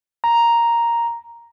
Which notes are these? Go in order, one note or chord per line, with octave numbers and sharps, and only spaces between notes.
A#5